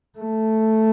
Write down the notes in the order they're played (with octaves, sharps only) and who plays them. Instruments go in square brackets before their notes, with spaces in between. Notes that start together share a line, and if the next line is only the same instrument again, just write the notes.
[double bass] A3